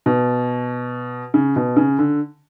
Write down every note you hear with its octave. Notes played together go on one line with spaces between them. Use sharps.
B2
C#3
B2
C#3
D3